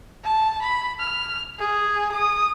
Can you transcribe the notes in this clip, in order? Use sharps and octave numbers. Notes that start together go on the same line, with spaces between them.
A5
B5
F6
G#4
D#6